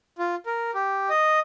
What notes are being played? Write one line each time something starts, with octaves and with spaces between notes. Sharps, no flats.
F4
A#4
G4
D#5